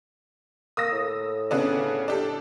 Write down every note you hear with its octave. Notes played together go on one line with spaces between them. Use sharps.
A#3 D#6 E6 A#6
A2
C#3 B3 D4
D4 G4 A4